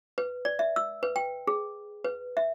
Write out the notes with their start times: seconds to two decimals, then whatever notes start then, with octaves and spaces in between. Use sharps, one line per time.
0.18 B4
0.45 D5
0.59 E5
0.76 E6
1.03 B4
1.16 G5
1.47 G#4
2.04 B4
2.37 E5